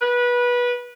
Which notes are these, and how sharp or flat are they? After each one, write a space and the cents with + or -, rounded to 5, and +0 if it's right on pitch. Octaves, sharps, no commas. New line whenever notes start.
B4 -20